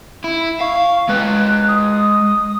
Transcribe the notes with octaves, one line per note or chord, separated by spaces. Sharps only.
E4
F5 C#6
G#3 B4 F#6
D#6